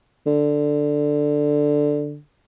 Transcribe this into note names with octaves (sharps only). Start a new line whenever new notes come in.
D3